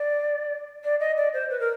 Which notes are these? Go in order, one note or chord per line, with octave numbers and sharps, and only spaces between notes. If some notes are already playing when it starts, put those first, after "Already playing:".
Already playing: D5
D5
D#5
D5
C5
B4
A#4